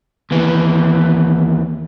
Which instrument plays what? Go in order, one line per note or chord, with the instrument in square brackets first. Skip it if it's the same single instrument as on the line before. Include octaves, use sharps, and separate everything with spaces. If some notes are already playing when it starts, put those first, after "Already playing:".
[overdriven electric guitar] D#2 E3